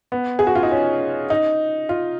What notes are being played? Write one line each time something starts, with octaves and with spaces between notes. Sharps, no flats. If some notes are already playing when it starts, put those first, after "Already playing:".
B3
G#4
F#4
F4
D#4
C#4
D#4
F4